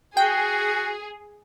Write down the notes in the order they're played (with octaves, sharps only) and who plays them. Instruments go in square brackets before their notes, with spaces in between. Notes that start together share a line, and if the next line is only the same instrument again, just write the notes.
[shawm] F#4 [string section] G#4 [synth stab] G5